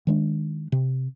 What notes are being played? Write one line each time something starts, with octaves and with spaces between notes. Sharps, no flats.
D#3 G#3 D4
C3